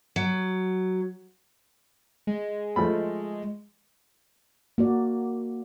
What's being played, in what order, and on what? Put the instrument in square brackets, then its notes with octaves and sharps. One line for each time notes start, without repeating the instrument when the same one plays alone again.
[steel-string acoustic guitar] F#3
[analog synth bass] G#3
[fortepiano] F3 A3 B5
[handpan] A#3 F#4 D5